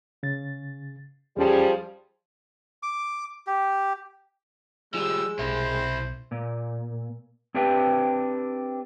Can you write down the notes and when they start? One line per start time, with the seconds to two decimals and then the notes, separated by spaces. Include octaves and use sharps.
0.23 C#3 A6
1.37 E2 F3 G3 C#4 G#4 A5
2.83 D6
3.47 G4
4.94 F3 G3 G#3 E6
5.39 B1 C3 C4 E4 C5
6.31 A#2
7.54 C4 D4 G4 B4 E5 G5